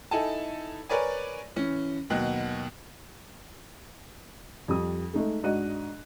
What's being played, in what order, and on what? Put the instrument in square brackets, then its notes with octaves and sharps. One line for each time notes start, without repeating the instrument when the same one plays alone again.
[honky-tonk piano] D#4 E4 A4 G#5 A5
A#4 B4 C#5 D5 G#5
E3 C#4
D#2 B2 F#3 F#6
[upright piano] F2 G3 D#6
G#3 A3 D#4 G#4
G#2 D4 F#4 D#5 F#6 D#7